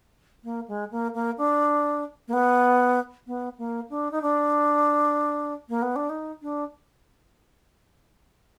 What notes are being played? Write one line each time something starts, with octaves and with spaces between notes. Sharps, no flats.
A#3
G#3
A#3
A#3
D4
A#3
B3
B3
A#3
D4
D#4
D4
A#3
B3
D4
D#4
D4